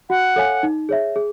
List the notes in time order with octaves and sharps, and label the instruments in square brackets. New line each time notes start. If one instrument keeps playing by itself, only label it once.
[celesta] F#4 [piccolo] F#5
[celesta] A4 C#5 F5 G#5
D#4
G#4 C#5 E5
G#4